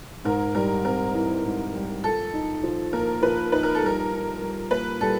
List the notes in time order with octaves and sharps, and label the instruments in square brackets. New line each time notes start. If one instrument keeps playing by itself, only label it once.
[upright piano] G#2 [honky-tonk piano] A#4
[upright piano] G3 [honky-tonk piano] A#4
[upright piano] C4 [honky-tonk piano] A#4
[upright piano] E3
G#2
G3
[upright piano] F3 [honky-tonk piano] A4
[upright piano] D#4
F3
[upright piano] A#3 [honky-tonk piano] A#4
[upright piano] F3 [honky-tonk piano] B4
[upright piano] D#4 [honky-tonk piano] B4
[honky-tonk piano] A#4
A4
[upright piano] G3 [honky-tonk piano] A#4
[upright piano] D#4
G3
[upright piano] A#3 [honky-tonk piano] B4
[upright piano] G3 [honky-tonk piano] A4